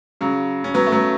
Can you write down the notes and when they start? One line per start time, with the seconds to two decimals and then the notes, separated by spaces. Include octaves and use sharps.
0.21 C#3 F#3
0.64 C#4
0.74 F#3 B3
0.87 A3
0.92 F#3 B3